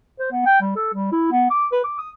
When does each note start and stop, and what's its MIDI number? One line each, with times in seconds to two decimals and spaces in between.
0.19 0.30 72
0.32 0.43 59
0.46 0.60 79
0.61 0.71 55
0.76 0.93 69
0.94 1.10 55
1.12 1.30 64
1.32 1.46 59
1.50 1.66 86
1.72 1.79 71
1.84 1.95 86
1.98 2.10 87